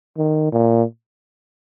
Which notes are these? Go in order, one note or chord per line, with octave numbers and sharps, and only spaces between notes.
D#3
A#2